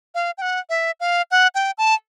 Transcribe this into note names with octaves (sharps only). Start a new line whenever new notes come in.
F5
G5
F#5
E5
F5
F#5
G5
A5